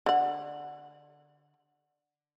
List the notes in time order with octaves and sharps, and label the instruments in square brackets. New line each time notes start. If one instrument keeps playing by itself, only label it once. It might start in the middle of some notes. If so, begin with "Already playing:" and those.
[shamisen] D3 F#5